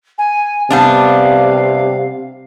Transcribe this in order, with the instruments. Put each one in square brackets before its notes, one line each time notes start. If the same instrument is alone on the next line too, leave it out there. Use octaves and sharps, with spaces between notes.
[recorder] G#5
[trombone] C3 [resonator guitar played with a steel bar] G3 B3 D4 [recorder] F5